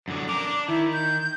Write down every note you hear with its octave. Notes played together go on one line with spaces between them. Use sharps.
F#2 D3
D4 A#4 D6
D4
D#3 E4
G6